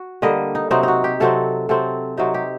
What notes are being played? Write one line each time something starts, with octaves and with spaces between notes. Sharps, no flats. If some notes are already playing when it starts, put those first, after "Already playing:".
Already playing: F#4
D3 G3 A#3 D#5
D#4
C3 F#3 C4 D#4
D#4 F#4
G4
C3 F#3 C4 A4
C3 F#3 C4 A4
C3 F#3 C4 D#4
G4